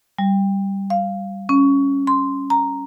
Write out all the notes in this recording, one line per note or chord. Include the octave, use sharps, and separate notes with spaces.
G3
F5
C#4
C6
A#5